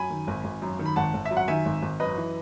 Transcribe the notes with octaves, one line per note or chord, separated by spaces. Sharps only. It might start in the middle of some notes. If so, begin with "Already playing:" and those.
Already playing: F#2 G#5 B5
D#3
G#1
G#1
F#2
D#3
B5
G#1 F#5 A5
G#1
E5
F#2
F#5
D#3 E5 G#5
G#1
G#1
F#2 B4 D#5
E3